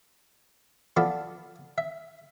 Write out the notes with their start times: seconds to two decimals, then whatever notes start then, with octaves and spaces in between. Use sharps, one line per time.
0.97 F3 B3 F4 A4 D5
1.78 E5